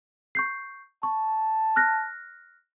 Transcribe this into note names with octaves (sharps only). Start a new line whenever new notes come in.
C#6 G6 C7
A5 C#6
F6 F#6 A#6